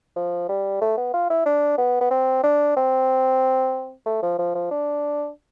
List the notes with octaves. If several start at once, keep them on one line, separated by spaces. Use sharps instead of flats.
F3
G3
A3
B3
F4
E4
D4
B3
B3
C4
D4
C4
A3
F3
F3
F3
D4